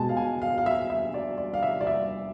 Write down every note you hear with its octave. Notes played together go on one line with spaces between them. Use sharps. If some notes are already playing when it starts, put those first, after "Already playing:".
Already playing: B2 G#3 G#5 A5
F5
G#5
F5
F5
E5
E5
D5
D5
F5
E5
D5
E5